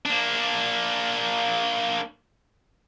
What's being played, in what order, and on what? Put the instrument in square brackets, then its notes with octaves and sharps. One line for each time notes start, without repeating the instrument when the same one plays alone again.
[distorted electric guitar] A#3 D4